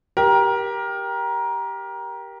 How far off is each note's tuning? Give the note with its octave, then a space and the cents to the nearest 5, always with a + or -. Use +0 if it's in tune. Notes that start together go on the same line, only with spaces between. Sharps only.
G4 +0 A#4 +20